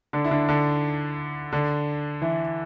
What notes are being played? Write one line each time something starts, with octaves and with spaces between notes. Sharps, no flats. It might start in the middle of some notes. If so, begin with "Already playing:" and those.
D3 D4
E4
D3 D4
D3 D4
D3 D4
E3 E4